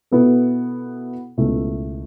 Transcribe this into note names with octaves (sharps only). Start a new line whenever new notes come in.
B2 B3 E4 A4
C#2 B2 A3 E4